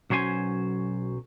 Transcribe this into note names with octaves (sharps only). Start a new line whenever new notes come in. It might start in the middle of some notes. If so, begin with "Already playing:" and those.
B1 F#3 C#4 C5 G#5